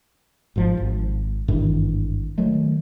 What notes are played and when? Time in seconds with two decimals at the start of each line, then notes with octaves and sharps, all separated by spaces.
0.56 G#1 G#2 F3
0.77 G#1
1.48 G#1 G2 D#3 E3
2.38 D#3 F#3 G#3 A3